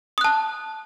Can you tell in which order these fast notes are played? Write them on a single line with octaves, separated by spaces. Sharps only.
D#6 F#6 A5